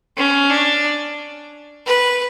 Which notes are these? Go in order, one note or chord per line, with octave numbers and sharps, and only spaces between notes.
C#4
D4
B4